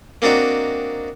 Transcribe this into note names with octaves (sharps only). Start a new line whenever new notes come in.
A#3 C4 D4 D#4 F#4